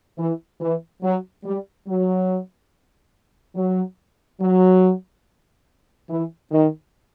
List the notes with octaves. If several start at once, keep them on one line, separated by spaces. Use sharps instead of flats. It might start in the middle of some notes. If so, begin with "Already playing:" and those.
E3
E3
F#3
G3
F#3
F#3
F#3
E3
D#3